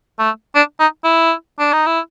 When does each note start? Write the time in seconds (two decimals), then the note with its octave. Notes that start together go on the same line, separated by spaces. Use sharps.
0.19 A3
0.55 D4
0.79 D#4
1.04 E4
1.59 D4
1.73 D#4
1.86 E4